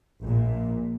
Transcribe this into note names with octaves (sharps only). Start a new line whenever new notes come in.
A#1 A#2